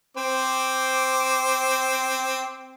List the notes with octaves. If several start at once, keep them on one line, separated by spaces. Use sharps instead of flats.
C4 C5 D6